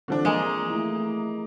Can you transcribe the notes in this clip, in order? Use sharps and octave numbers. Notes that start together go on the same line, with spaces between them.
D3 E3 F3 C4 D4
F3 G#3 A#3 D#5 A#5
A3 E4